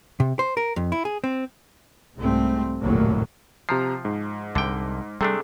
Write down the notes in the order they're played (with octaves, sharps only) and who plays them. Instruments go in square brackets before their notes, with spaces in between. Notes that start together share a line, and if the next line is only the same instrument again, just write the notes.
[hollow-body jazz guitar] C3
C5
A#4
F2
E4
G#4
C4
[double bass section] C2 G#2 G3 A3 C4
F1 A#1 D#2 A2 F#3 A#3
[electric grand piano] C3 A#5 C7 [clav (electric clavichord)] F3
[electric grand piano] G#2
[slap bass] C2 [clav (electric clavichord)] D3 G5
[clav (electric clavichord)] C3 A3 D4 [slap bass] G3 [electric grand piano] G#4 A4 C7